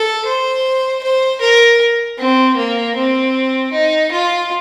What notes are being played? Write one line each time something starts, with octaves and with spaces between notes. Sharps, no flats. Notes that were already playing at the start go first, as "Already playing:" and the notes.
Already playing: A4
C5
C5
A#4
C4
A#3
C4
D#4
F4